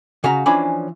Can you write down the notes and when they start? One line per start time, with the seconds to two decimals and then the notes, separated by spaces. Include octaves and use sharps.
0.24 C#3 F#4 F5 A#5
0.46 E3 F3 C#4 D4 G#5 B5